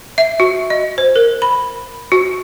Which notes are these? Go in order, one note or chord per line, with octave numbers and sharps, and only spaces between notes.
E5
F#4
D#5
C5
A#4
B5
F#4